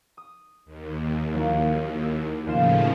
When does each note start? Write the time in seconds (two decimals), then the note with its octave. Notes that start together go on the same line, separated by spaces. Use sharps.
0.17 D#6
0.65 D#2
1.34 F#3 A#3 E4
2.03 E6
2.47 D#2 A2 C#3 F3 F4 E7